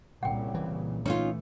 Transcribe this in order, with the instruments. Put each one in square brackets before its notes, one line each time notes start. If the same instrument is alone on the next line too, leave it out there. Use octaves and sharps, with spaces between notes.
[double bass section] C2 A#2 C#3 [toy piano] F#5 G5
[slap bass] E3
[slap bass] E3 A3 [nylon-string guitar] C#4 D#4 F4 [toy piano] A#5